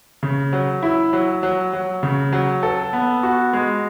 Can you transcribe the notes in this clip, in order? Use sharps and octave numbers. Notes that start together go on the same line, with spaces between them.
C#3
F#3
E4
F#3
F#3
F#3
C#3
F#3
A4
B3
F#4
G#3